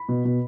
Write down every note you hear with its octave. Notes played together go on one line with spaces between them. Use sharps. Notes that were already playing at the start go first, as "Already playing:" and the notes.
Already playing: B5
B2
B2